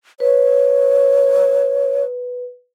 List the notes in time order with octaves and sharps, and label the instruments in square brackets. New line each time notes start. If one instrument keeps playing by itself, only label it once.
[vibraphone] B4 [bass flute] C#5